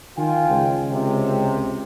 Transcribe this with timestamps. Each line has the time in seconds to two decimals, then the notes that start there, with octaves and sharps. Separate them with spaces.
0.17 D#3 F4 G5 G#5
0.50 C#2
0.90 C3